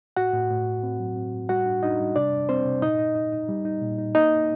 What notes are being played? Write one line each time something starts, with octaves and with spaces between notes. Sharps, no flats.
A2 F#4 F#5
A2
A2
A2
C4
F#3
C4
A2
G3 F#4 F#5
D4
D4 D#4 D#5
G3
C3 D4 D5
C3
G3 C4 C5
C3
A#2 D#4 D#5
D#4
D#4
D#4
G3
D#4
A#2
D#4
A#3 D#4 D#5